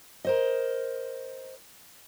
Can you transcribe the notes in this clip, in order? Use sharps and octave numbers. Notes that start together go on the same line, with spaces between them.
A#4 C5 D#5